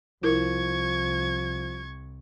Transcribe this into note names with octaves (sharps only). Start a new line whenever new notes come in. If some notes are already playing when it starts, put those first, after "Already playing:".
C2 F3 E4 A#4 C#6 G#6